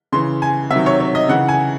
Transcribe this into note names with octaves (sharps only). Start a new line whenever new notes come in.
C#3 E3 C6
G#5
C3 D#3 F#3 E5
C#5
C#5
D#5
C#3 E3 F#5
G#5